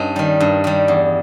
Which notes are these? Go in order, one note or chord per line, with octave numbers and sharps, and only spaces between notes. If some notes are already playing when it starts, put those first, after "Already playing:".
Already playing: G2 C#4 D#4
D#3 G3
G2
D#3 G3
E2